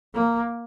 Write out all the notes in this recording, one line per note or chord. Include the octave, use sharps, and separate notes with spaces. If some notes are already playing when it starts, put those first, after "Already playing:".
A#3